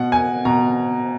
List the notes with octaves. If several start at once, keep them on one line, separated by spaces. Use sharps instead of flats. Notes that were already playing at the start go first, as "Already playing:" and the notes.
Already playing: B2 F#5
G#5
B2 A#5